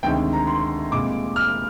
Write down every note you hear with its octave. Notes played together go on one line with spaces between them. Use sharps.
D2 C3 D#3 G#3 G5
A#5
C6
C2 A#2 G#3 D6
F6